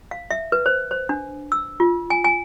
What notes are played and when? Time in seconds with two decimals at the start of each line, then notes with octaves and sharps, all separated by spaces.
0.11 F5
0.31 E5
0.52 B4
0.66 C5
0.91 C5
1.09 D4
1.52 E6
1.80 F4
2.10 G#5
2.24 G#5